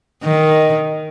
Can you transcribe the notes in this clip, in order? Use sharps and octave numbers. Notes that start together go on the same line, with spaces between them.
D#3